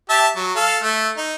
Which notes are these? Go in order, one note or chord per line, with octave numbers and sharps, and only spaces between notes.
G4 E5 A5
F#3
A4 F5
A3
D#4